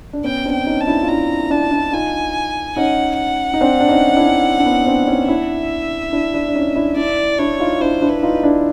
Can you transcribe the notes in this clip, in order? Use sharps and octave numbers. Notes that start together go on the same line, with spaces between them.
D4
B3 C#4 G5
C4 D4
G5
C#4 D#4
A5
D4 E4
F4
D4 E4 A#5
D4 E4 A5
D4 E4
D#4 F4 G#5
C#4 D#4 F#5
F#5
D#4
C4 D4
D4
C#4 D#4
D4 E4
D4
B3 C#4
C4 D4
C#4 D#4
D4 E4 E5
D4 E4
D4 E4
D4
C#4 D#4
D4 E4
D4 E4 D5
D4 E4 C#5
D#4 F4
D4 E4 C5
D4 E4
B4
D#4 F4
D4 E4